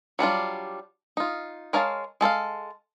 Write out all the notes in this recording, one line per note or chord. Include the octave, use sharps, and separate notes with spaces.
F#3 G3 D4 F4
D#4 F4
G#3 A#4 C#5 F5 A5
G#3 A4 C5 F5